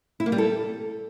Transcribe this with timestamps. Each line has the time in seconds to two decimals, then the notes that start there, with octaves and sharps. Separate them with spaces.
0.20 E4
0.26 A#3
0.32 G3
0.38 A4